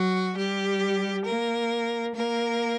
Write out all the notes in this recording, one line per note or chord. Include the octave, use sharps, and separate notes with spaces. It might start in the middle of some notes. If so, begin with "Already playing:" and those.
Already playing: F#3 F#4
G3 G4
A#3 A#4
A#3 A#4